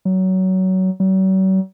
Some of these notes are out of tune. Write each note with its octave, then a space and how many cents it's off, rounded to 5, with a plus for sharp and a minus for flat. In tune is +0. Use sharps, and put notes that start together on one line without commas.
F#3 +20
F#3 +45